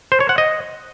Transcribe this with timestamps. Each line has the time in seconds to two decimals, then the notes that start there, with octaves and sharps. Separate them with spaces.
0.12 C5
0.20 C#5
0.29 F#5
0.38 D#5